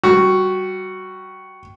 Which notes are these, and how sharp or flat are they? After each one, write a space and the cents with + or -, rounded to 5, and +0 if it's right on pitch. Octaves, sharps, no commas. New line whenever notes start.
G3 -20 F#4 +0